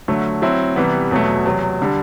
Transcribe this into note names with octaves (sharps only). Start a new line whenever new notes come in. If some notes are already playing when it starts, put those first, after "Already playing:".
D3 F#3 A3
F#3 C4 E4
C3 E3 G3 B3
E2 B2 F#3 A3
E2 C3 F#3
D3 G3